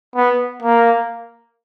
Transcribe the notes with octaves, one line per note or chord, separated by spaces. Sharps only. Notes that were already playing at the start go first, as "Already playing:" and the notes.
B3
A#3